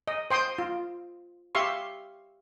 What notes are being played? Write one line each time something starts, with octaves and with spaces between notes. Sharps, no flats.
D#5
C5 G5 C6 D#6
F4
G4 E5 F5 C6 C#6